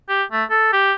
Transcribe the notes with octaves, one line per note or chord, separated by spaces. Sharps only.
G4
A3
A4
G4